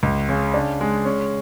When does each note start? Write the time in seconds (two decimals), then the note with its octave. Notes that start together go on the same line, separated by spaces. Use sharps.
0.03 C#2
0.29 C#3
0.54 D4
0.81 G#3
1.05 C#4